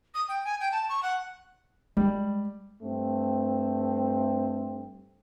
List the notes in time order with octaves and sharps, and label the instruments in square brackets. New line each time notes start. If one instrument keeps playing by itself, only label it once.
[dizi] D#6
G5
G#5
G5
A5
C#6
F#5
[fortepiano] G3 [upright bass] G#3
[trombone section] G2 A3 C4